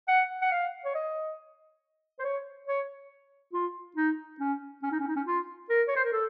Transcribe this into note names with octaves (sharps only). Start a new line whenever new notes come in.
F#5
F#5
F5
C#5
D#5
C5
C#5
C#5
F4
D#4
C#4
C#4
D#4
C#4
D#4
C#4
F4
A#4
C#5
C5
A#4
A4